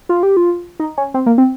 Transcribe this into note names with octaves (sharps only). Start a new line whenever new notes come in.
F4
G4
F4
D#4
C#4
C4
A#3
C4